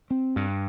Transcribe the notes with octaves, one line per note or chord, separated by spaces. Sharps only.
C4
G2